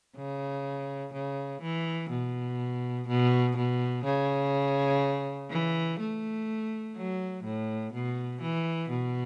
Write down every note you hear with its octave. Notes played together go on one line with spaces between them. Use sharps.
C#3
C#3
E3
B2
B2
B2
C#3
E3
A3
F#3
A2
B2
E3
B2